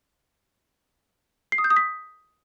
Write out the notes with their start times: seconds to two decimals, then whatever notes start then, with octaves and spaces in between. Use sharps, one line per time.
1.52 C7
1.58 D#6
1.64 G6
1.70 D#6
1.76 B6